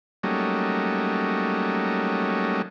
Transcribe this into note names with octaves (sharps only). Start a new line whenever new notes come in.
F#3 G3 A3 A#3 C#4 D#4